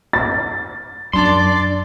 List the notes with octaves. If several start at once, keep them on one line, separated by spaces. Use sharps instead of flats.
A6
F#2 D4 D5 C6